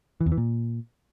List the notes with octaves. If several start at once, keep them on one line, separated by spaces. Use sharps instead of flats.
E3
E2
E3
A#2